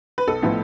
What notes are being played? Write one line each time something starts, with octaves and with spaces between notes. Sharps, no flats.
B4
B1 A4
A2 F3 B3 E4